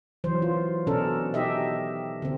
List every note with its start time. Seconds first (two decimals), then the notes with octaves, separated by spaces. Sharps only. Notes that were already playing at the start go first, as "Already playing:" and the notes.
0.24 E3 F#3 C5
0.42 F4
0.87 B2 C#4 D4 A4 A#4
1.34 D#4 G4 D#5 E5
2.22 D3 C4